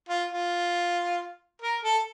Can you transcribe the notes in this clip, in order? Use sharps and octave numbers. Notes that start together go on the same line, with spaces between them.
F4
F4
A#4
A4